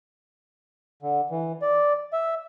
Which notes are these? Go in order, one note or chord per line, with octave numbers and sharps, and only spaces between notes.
D3
E3
D5
E5